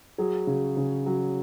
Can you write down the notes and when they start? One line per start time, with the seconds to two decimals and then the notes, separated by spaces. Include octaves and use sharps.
0.18 F#3 G#4
0.47 C#3
0.77 C#3
1.06 F#3